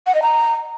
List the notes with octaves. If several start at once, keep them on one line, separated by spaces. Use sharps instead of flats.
F#5
D#5
A#5